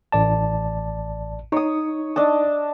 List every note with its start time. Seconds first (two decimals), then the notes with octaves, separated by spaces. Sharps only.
0.12 A1 D5 A5
1.52 D#4 C#5 D#6
2.16 D4 D#5 A5